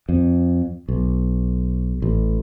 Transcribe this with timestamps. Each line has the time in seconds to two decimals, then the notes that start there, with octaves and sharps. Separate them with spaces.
0.09 F2
0.88 B1
2.02 A1